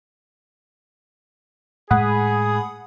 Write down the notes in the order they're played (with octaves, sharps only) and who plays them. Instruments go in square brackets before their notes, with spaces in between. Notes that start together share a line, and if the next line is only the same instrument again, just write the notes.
[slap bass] A2 G#3 [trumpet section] G#4 [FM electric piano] F#5 B5 D#6